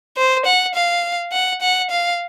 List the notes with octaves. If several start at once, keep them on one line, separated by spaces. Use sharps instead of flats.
C5
F#5
F5
F#5
F#5
F5